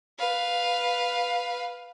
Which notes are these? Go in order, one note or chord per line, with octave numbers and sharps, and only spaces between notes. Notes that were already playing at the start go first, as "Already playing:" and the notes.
B4 F5